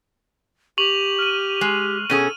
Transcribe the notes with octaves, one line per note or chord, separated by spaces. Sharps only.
G4 C#6 F7 F#7
F6 D#7
G#3
B2 C#4 G#4 A4 D#7